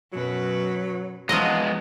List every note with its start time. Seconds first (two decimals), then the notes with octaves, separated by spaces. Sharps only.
0.13 F#2 B2 F#3 B4
1.29 E2 F3 F#3 G#3 B3 D#5